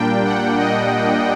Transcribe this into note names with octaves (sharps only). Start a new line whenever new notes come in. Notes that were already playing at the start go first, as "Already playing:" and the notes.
Already playing: A#2 G3 A#3 D4 G5
F#5
D#5